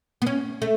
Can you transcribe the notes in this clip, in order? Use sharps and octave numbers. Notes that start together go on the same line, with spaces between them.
B3
C#4
A3